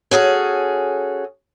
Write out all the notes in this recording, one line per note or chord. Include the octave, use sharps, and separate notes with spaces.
C#4 F#4 G#4 A4